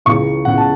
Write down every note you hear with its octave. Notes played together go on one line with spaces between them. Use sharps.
C#2 C#3 E3 C#6
C#2 C#3 E3 F#5
A5